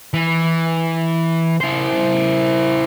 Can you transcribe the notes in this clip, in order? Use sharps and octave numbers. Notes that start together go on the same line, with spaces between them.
E3
E4 C5